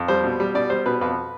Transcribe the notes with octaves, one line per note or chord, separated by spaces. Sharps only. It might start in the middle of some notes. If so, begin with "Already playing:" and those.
Already playing: F2
G3 C5
B2
G3
B2 D5
G3 C5
B2 B4
F2 B4